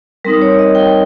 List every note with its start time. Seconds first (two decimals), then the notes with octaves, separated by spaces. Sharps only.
0.25 G3 C4 D#4 A#4
0.42 C#5
0.59 D#5
0.75 G5